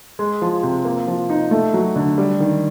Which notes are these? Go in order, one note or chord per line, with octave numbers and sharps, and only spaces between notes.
G#3
F3
C3
A#3
F3
D#4
A3
F#3
D3
G3
D#3